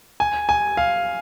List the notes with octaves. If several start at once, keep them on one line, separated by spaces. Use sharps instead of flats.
G#5
G#5
F5